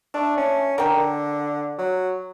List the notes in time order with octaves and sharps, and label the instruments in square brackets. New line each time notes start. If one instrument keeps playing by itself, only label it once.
[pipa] A3 [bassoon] D4
[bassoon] C#4
[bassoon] D3 [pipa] A#4 G5
[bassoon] F#3